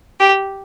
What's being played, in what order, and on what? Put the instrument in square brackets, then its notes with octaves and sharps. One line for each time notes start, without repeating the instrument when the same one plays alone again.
[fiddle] G4